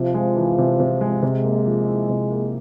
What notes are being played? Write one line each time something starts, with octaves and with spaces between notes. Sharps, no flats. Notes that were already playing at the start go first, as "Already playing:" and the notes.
Already playing: C3 F3
G#3
E3
C3
C3
G#3
C3 G#3
A#3
F3
E4
C3
A#3